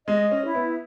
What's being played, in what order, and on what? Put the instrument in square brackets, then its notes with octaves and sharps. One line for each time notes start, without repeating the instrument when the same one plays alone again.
[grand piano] G#3 [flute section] D#5
[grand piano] C#4
[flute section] E4
[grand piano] B3